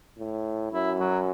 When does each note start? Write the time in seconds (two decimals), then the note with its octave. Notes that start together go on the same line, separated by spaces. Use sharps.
0.18 A2
0.72 F#2 E4
1.00 F#3